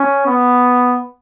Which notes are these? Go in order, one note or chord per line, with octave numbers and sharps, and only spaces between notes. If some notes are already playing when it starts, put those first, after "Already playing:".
Already playing: C#4
B3